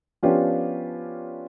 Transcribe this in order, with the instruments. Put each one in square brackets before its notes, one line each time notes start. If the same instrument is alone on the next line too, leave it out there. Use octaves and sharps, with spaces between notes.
[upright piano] F3 B3 C#4 D4 F4 G4